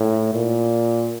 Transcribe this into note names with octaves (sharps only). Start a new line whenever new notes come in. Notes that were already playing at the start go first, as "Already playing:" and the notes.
Already playing: A2
A#2